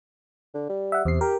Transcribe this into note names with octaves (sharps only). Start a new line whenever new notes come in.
D3
G3
E5 F#5
E2 C3 C7
G4 A#4